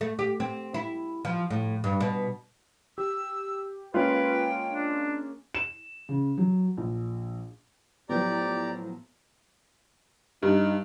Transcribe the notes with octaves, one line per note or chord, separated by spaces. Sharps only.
A3
G4
C4
E4
F3
A2
G2
B2
G4 E6
G#3 A#3 C#4 F4 B4 G5
D4
E7
C#3
F#3
A#1
A2 F3 F#3 B3 G4 D5 A#5
G2 D#4